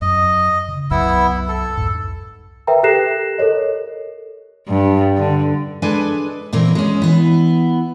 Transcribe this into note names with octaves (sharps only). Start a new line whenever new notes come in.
F#2 D#5
C#3
C2 F#2 F#3 B3 E4 E6
A4
C2 F2 G#2
A#4 B4 E5 G5 A#5
G4 A4 F#6 A#6 C7 E7
A4 A#4 C#5 D#5
G2
D3
G#3 D4 A4 B4 G#5
A#2 E3 C4 A#4
G#3 C#4
E3 B3